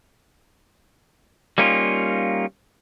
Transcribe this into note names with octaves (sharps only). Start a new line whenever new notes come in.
G3 A#3 C#4 D#4 F4